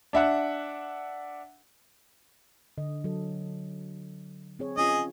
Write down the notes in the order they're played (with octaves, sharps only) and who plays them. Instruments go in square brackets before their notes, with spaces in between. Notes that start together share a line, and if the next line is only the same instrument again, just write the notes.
[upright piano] D4 E5 F#5
[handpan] D3 D#5
F#3 A4
C4 G#4 C#5
[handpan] C#4 F4 [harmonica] G#4 D#5